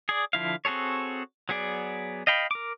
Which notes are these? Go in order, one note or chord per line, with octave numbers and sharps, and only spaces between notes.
G#4 D5
D3 F3 E4 F5
C4 F#4 G#4 A4 C#5
F#3 B3 G#4 D5
D#5 F5 G5 B5
A#4 D6